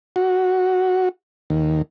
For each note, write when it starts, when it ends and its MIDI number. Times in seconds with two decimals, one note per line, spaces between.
0.16 1.09 66
1.50 1.82 39